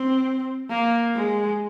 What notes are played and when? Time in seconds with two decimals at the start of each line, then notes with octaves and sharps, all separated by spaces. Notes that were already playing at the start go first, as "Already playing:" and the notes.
Already playing: C4
0.70 A#3
1.16 G#3